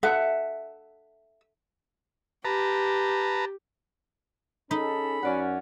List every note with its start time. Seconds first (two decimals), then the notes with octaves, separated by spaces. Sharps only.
0.03 A4 E5 F#5
2.45 G4 B4 A5 A#5
4.71 C#4 D#4 G#4 A4 B5
5.23 F#2 C#4 F#4 D5 F#5